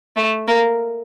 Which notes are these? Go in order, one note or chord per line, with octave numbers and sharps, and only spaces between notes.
A3
A#3